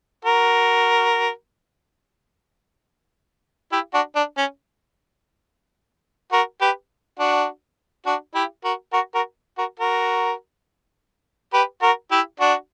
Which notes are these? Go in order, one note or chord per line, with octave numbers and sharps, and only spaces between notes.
F#4 A#4
E4 G4
D4 F#4
D4
C#4
F#4 A#4
G4 B4
D4 F#4
D4 F#4
E4 G4
F#4 A#4
F#4 A#4
F#4 A#4
F#4 A#4
F#4 A#4
G4 B4
F#4 A#4
E4 G4
D4 F#4